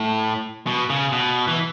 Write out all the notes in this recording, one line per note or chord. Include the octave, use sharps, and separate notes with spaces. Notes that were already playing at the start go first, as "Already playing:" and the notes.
Already playing: A2
B2
C#3
B2
E3